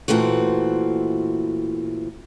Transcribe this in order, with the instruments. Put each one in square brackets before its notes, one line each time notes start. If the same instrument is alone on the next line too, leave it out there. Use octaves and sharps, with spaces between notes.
[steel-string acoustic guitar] A#2 E3 A3 C4 F#4